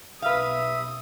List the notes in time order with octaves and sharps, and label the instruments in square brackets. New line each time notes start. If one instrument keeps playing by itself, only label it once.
[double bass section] B1 [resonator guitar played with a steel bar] B4 F5 [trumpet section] E5 [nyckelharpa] D#6